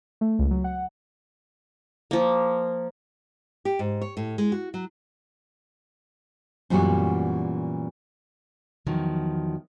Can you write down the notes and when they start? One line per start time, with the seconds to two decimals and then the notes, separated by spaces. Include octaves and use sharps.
0.21 A3
0.39 C#2
0.51 F#3
0.64 F#5
2.11 F3 A#3
3.65 G4
3.79 G#2
4.01 C#5
4.17 A2
4.38 G#3
4.52 F#4
4.74 F#3
6.70 F#2 A#2 E3 G3 B3 F#4
8.87 E2 D#3 F3 F#3